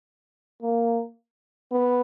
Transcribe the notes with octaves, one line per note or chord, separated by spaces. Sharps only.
A#3
B3